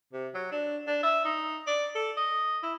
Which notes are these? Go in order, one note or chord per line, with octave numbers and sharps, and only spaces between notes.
C3
F#3
D4
D4
E5
D#4
D5
A4
D#5
E4